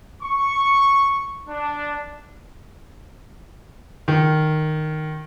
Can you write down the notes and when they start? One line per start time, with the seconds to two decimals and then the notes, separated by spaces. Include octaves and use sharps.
0.22 C#6
1.49 D4
4.08 D#3